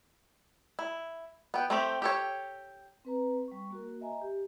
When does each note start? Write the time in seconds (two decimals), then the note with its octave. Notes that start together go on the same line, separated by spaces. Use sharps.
0.79 E4
1.54 B3 G5
1.70 A3 C4 G4
2.02 G4 A4 C#5
3.05 C4 B4 A#5
3.48 G3 C#6
3.70 A#3 F#4 A#4
4.01 D#5 E5 G#5 A#5
4.21 G4